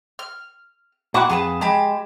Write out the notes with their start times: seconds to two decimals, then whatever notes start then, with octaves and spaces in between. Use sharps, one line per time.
0.19 F6
1.14 A#2 E4 F#4 F#5 D6 F#6
1.30 F2 G#4 B4 A5
1.61 G#3 G4 A5 B5